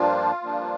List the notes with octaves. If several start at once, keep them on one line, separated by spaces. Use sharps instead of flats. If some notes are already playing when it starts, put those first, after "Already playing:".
Already playing: G2 F3 A#3 D4 F4
G2 F3 A#3 D4